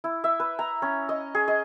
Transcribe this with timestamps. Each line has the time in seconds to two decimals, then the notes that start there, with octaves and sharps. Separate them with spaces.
0.04 E4
0.24 E5
0.40 B4
0.59 A#5
0.82 C#4
1.09 D#5
1.35 G#4
1.48 D#5